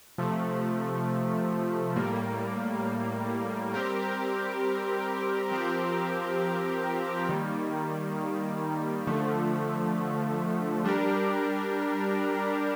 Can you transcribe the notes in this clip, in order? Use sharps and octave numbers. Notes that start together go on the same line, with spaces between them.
C3 F3 A3
A2 G3 A#3
G3 C4 G4 A#4
F3 C4 G4 A#4
D#3 G3 A#3
D3 F3 A3
G3 D4 G4 A#4